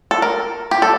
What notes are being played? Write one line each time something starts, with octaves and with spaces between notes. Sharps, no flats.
A4
A#4
G4
A4